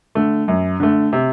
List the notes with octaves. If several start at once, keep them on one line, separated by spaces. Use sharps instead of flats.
D3 A3
F#2
D3 A3
C3